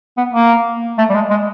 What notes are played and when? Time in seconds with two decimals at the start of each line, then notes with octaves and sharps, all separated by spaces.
0.17 B3
0.33 A#3
0.98 A3
1.10 G3
1.14 G#3
1.30 G#3